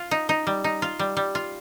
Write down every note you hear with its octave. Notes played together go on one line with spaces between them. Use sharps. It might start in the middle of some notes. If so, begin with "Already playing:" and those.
Already playing: F4
D#4
D#4
G3
D#4
F4
G3
G3
F4